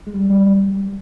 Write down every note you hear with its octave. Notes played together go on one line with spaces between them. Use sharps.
G#3
G3
G3
G3